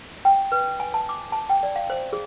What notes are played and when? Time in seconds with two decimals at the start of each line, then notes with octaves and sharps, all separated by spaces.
0.25 G5
0.52 B4
0.80 G#5
0.94 A5
1.09 D6
1.32 A5
1.49 G5
1.63 D5
1.76 F5
1.90 C5
2.13 G#4